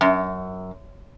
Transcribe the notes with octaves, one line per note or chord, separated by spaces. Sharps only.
F#2